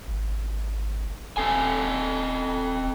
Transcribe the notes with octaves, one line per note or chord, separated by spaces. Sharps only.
G#1
D#1 C4 A4 G#5